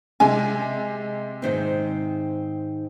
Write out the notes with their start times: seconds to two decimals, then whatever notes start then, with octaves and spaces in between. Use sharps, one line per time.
0.20 C3 G#3 G#5
1.42 G#2 D#3 C4